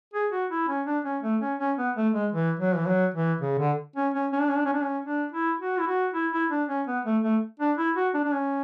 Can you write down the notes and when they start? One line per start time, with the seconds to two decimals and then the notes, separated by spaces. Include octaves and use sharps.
0.14 G#4
0.32 F#4
0.50 E4
0.68 C#4
0.86 D4
1.05 C#4
1.23 A3
1.41 C#4
1.59 C#4
1.78 B3
1.96 A3
2.14 G#3
2.32 E3
2.59 F#3
2.76 E3
2.87 F#3
3.14 E3
3.41 C#3
3.59 D3
3.96 C#4
4.14 C#4
4.32 C#4
4.40 D4
4.49 C#4
4.57 D4
4.65 C#4
4.73 D4
4.82 C#4
5.05 D4
5.32 E4
5.60 F#4
5.79 E4
5.87 F#4
6.14 E4
6.33 E4
6.51 D4
6.68 C#4
6.87 B3
7.05 A3
7.23 A3
7.60 D4
7.77 E4
7.96 F#4
8.14 D4
8.24 D4
8.32 C#4